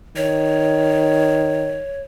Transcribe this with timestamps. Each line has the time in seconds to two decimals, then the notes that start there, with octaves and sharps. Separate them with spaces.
0.16 D#3 C#5